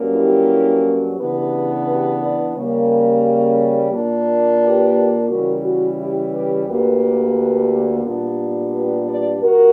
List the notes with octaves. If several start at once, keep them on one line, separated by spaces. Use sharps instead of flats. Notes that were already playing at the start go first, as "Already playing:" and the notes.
Already playing: G2 F#3 A#3 C#4
E4 G4
C#3 E3 B3 D4 G4 B4
G4 B4
B4 D5
C#3 G3 A#3
A#2 A#3 D4
G4 B4
C#3 E3 G3 F#4 A#4
F#4
E4 G4
G4 B4
D2 D3 A#3 G4 B4
A#2 G3 B3 D4
G4 B4
B4 D5
G2 F#4 A#4